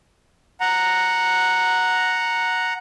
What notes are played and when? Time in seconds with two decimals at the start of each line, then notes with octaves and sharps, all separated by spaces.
0.60 F#5 A#5